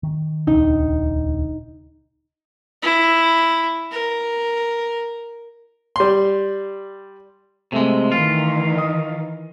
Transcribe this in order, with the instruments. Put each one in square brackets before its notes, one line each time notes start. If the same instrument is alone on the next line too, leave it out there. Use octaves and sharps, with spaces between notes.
[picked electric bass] D#3
[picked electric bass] D#1 C#2 D4 [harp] D#4
[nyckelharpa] E4
A#4
[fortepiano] G3 C6
[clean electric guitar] C3 G#3 [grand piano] A3
[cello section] D#3 E3 [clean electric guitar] F4
[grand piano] D#5 D#6